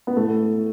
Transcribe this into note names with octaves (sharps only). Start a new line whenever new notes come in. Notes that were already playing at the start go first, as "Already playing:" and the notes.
B3
A2 A3